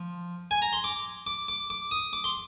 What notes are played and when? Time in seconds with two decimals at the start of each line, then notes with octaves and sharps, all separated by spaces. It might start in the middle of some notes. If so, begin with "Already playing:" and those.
Already playing: F3
0.51 G#5
0.62 A#5
0.73 C6
0.84 D6
1.27 D6
1.48 D6
1.70 D6
1.91 D#6
2.13 D6
2.24 C6